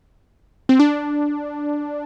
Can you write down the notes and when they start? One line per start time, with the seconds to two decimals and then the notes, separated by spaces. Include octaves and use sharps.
0.69 C4
0.79 D4